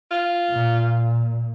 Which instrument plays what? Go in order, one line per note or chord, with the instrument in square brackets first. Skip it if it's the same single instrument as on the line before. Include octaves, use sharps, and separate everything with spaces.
[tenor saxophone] F4
[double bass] A#2